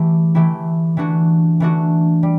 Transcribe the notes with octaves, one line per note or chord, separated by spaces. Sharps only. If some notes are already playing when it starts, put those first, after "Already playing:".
Already playing: E3 A3 E4 G4
E3 A3 E4 G4
E3 A3 D4 F#4
E3 A3 D4 F#4
G3